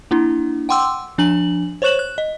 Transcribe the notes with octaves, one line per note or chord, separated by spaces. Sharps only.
A#3 D4 E4
F#5 G5 C6 D6 E6
F3 D4 G#5 F#7
C5 C#5 C#6 F#6 E7 F#7
F#6
D#5